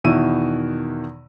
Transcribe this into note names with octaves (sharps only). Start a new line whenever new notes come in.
E2 B2 D#3 E4 E6 D#7